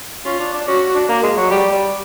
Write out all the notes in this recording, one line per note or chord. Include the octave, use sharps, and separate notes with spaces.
C#4 F4
D4
D4
C#4 F#4
D4
A#3
G#3
F#3
G3 G4
G3